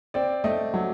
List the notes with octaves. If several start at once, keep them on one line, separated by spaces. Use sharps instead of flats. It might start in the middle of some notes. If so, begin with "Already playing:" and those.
C4 D5
A3 D#5
F#3